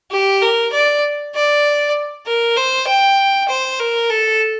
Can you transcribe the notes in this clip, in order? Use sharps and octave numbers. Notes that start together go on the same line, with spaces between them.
G4
A#4
D5
D5
A#4
C5
G5
C5
A#4
A4